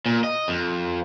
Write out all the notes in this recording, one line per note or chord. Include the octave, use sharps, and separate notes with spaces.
A#2
D#5
F2